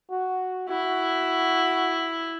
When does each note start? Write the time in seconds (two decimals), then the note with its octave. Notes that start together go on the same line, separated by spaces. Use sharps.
0.11 F#4
0.69 E4 F#4